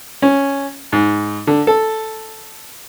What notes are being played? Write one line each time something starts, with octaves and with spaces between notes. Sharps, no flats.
C#4
G#2
D3
A4